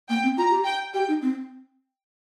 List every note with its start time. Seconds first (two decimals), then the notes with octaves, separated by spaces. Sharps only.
0.09 A#3 G5
0.23 C4
0.37 F4 A#5
0.51 G4
0.65 G5
0.94 G4 G5
1.08 D#4
1.22 C4